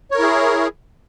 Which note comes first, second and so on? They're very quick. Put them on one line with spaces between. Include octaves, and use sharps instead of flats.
C#5 A#4 E4 G#4